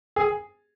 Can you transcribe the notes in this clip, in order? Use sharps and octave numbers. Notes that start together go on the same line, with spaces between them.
G#4